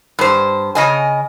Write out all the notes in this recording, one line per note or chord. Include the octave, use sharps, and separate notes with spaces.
G2 C5
C#3 D#5 G#5